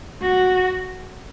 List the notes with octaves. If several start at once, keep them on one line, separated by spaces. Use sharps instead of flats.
F#4